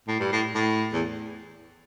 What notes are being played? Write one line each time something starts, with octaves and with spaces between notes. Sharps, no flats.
A2
G2
A2
A2
E2